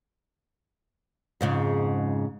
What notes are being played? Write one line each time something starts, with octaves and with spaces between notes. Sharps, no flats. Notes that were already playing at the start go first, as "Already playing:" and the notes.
F2 G#2 C#3